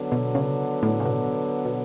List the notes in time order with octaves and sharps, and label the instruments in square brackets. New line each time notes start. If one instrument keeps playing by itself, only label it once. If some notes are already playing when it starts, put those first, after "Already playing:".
Already playing: [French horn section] D3 F#3 B3
[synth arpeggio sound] B2
C#3
A2
C#3
B2
B2